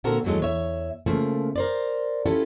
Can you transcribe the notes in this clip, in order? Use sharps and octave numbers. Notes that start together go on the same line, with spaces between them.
A#2 D3 C4 F#4 A4 A#4
D#2 E3 F#3 G#3 A4
E2 C#5 E5
C#3 F3 A3 A#3
A#4 C5 D5
C#4 E4 F4 G4 A4